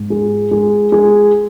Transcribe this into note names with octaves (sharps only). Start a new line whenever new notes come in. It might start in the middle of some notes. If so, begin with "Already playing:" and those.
Already playing: G#2
G#3
G#3
G#3